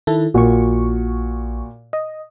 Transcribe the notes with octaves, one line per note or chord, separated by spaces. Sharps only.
D#3 E4 A4
A#1 A#2 F#4 C#6
D#5